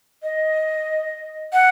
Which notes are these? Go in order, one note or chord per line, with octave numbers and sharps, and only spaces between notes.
D#5
F#5